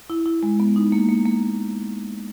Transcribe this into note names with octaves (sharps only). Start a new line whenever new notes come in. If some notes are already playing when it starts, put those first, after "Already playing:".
E4
E4
G#3
B3
D#4
A#3
A#3
A#3